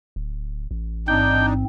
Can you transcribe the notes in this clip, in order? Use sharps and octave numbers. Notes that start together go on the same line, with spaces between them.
D1
A1
G#2 C4 D4 D#4 G5